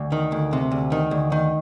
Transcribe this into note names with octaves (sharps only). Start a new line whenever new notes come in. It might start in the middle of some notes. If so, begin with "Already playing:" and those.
Already playing: D2
D#3
D2
C3
D2
D#3
D2
D#3